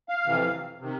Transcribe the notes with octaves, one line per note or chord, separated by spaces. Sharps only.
F5
F2 C3 E3
C3 D#3